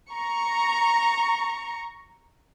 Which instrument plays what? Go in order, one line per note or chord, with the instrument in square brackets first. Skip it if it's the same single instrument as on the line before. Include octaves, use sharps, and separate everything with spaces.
[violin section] A#5 C#6